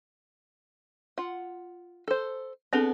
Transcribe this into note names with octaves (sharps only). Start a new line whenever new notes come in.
F4 F#5
A4 C5
B3 C4 D4 G#4 A4 F#5